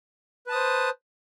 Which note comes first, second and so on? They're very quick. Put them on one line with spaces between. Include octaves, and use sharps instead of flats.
B4 A5 D#6 C5